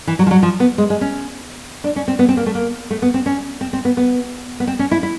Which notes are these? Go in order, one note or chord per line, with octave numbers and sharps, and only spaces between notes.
E3
F#3
F3
F#3
F3
B3
G#3
G#3
C#4
D4
C#4
C4
B3
C4
A#3
A3
A#3
A3
B3
C4
C#4
C4
C4
B3
B3
B3
C4
C#4
E4
E4